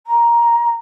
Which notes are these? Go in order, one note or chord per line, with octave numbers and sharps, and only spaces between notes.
A#5